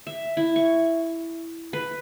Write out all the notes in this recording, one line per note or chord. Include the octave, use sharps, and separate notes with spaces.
E5
E4
C#6
B4